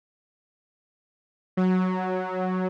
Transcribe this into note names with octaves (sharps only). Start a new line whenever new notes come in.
F#3